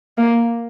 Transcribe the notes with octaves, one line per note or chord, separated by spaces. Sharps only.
A#3